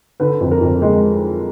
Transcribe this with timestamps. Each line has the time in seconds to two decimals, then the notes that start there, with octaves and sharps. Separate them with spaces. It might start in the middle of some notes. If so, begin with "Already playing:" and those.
0.20 D3 B4
0.41 F2
0.51 A#4
0.61 F2
0.82 G#3